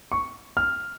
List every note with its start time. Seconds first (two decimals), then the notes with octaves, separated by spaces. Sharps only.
0.12 C#6
0.57 F6